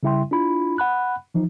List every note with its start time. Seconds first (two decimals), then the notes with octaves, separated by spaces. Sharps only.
0.03 C#3 G3 E4 E5 G5 C6
0.31 D4 E4 F4 B5
0.78 F#5 B5 F#6
1.34 E3 F3 D#4